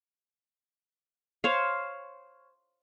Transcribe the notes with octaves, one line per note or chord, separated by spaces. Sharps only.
C5 C#5 F5